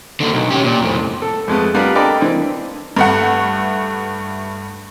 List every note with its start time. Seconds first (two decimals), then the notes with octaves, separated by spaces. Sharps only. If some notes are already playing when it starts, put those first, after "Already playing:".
0.20 D3 A#3
0.34 B1
0.50 C#4 G4
0.64 A#2
0.82 F2 A2
1.22 A4
1.48 F2 G#3 A3 B3
1.74 G3 B3 D4 F4 A#4 F5
1.95 A4 A#4 D5 D#5 G5 B5
2.21 E3 C4 D4
2.97 G2 A3 F#5